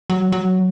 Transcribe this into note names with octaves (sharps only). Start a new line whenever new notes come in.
F#3
F#3